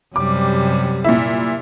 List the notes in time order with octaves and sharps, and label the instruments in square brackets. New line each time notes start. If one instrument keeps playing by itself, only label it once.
[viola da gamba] F#2 C3 G3 [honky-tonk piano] D6
[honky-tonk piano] A#2 E4